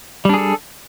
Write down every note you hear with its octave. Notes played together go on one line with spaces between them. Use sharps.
G3 D4 G#4 A4